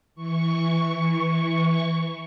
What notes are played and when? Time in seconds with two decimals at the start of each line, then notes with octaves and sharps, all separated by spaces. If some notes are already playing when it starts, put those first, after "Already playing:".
0.15 E3 C#6